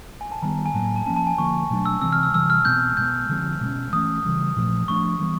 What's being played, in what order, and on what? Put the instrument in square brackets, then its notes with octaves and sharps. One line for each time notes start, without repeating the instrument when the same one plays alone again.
[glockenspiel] G#5
A5
[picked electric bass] D#3 G3 B3 [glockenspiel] A#5
[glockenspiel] G#5
[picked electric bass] A2 F#3 A#3 [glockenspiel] A5
[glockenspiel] G#5
A5
[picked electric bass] F3 A#3 C#4 [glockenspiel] A5
[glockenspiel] A5
G#5
[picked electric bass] D3 F3 A#3 [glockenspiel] C#6
[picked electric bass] B2 F#3 A3 D4
[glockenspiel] E6
[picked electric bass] C3 E3 G#3 C4 [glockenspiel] E6
[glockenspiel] F6
E6
[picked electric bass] C3 E3 G3 [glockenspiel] E6
[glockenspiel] F6
[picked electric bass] B2 G#3 C4 [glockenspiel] G6
[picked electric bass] B2 G#3 B3 [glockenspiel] G6
[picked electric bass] D3 F3 G#3 C4
B2 G#3 C#4
[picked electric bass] E3 A3 C#4 [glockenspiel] D#6
[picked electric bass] C#3 E3 G3
A#2 F3 A3
[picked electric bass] F3 A3 D4 [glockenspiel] C#6
[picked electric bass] E3 G3 B3